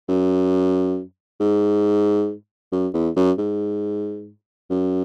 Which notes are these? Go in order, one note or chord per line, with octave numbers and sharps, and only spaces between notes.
F#2
G#2
F#2
E2
F#2
G#2
F#2